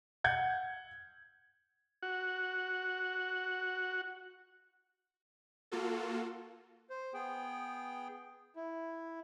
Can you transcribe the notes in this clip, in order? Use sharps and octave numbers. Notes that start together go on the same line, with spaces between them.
F#5 G6 G#6
F#4 F#5
A#3 F4 F#4 A4
C5
B3 G#4 G5
E4